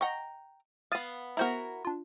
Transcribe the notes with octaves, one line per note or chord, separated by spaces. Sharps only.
D#5 F#5 G5 A#5 C#6
B3 F5 D#6 A6 D#7
B3 E4 F#4 A#4 C5 A#5
D4 F4